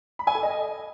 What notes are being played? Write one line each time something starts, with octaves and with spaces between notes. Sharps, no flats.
B5
G#5
A4
D#5